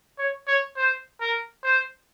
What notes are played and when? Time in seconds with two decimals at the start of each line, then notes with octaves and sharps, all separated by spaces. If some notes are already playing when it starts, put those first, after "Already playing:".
0.19 C#5
0.48 C#5
0.76 C5
1.20 A#4
1.64 C5